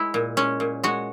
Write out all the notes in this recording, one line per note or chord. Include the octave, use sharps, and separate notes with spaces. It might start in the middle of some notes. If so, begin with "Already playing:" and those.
Already playing: G#3 E4
A#2
G#3 C#4
A#2
G#3 F#4